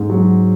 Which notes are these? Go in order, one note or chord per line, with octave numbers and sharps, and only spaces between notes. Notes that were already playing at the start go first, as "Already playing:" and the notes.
Already playing: G#2
F#3